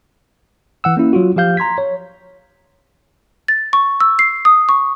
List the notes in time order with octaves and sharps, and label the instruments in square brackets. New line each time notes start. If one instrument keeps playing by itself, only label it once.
[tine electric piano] E3 F#5 E6
A#3 C#4 E4
F#3 F4 F#4
F3 G4 F5 G6
A#5 C6 G#6 B6
C#5
[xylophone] A6
C#6
E6
C7
D#6
C#6